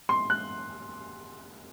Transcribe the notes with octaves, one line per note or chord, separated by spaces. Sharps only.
C6
F#6